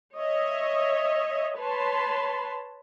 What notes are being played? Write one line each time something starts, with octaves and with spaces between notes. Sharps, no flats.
C#5 D#5 E5
B4 C#5 A5 B5 C6